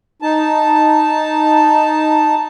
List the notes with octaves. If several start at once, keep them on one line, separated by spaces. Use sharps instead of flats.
D#4 A5